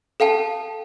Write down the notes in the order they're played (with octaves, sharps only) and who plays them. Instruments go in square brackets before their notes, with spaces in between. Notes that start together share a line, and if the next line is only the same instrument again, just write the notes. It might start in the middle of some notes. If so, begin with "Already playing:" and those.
[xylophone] A4 F5 G5 A5